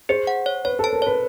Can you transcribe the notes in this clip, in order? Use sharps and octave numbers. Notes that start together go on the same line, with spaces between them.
G#4 C5
F#5
C#5
B4 C#5
A4 A5
A#4
B4 C#5